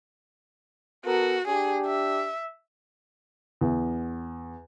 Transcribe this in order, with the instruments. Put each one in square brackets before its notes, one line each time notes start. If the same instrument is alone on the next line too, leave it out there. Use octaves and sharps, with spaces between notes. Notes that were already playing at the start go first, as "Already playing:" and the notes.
[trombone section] B3 A4 A#4 [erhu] F#4
[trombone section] D4 G4 [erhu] G#4
[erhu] E5
[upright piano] E2